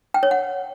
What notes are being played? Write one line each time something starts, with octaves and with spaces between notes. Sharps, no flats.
G5
C#5
F#5